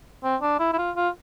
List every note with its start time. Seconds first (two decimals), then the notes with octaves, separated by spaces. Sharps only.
0.24 C4
0.42 D4
0.59 E4
0.73 E4
0.78 F4
0.96 F4